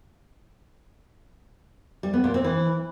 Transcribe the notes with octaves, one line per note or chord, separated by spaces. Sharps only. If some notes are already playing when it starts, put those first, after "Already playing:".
G3
B3
A#2
C4
E3